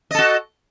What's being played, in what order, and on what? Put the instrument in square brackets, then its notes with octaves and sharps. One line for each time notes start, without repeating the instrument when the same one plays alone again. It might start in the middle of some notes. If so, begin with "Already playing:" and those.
[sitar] D#5
A4
F#4